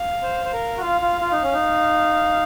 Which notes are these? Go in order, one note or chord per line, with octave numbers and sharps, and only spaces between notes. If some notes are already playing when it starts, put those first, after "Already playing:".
Already playing: F5
C5
C5
A#4
F#4
F4 F5
F4
F4
D#4
C#4
D#4